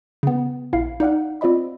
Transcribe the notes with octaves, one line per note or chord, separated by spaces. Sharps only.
C#3 B3
A#1 E4 F5 C7
D#4 D5 F5 F#5
C4 F4 D5 D#5 B5